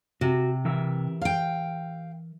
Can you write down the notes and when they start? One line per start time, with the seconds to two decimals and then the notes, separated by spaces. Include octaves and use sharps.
0.21 C3 F#4
0.65 E3 A#4 E5
1.21 F5 G5